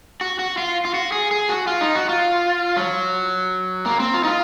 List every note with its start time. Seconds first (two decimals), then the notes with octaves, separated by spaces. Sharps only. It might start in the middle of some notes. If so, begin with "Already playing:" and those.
0.21 F#4
0.39 F#4
0.58 F4
0.85 F4
0.94 F#4
1.12 G#4
1.31 G#4
1.49 F#4
1.67 F4
1.81 D#4
1.95 F#4
2.09 F4
2.77 F#3
3.86 A#3
4.00 C4
4.14 F4
4.24 D#4
4.27 F4